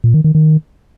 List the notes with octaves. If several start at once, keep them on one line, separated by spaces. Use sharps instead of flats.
A#2
D#3
D#3
D#3